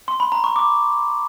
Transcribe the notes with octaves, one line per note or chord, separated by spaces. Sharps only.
C6
B5
A#5
C#6
D6